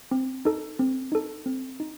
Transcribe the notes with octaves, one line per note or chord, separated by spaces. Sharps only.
C4
D#4 A4
C4
D#4 A4
C4
D#4